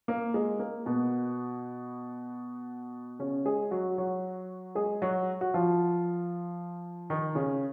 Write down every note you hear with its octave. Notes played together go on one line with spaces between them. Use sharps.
A#3
G#3
A#3
B2 B3
C#3 C#4
G#3 G#4
F#3 F#4
F#3 F#4
G#3 G#4
F#3 F#4
F#4
F3 F4
D#3 D#4
C#3 C#4